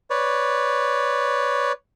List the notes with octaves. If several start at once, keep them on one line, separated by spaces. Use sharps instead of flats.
B4 C#5 D5